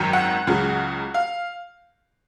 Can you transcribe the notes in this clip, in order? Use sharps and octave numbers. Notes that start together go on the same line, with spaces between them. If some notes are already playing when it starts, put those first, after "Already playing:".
Already playing: G#1 F#2 D#3 F#3
F#5
C#2 C#3 F#3
F5